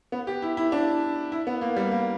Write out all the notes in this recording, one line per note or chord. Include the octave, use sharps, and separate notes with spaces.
B3
G4
E4
E4
D4
E4
B3
A#3
G3
A#3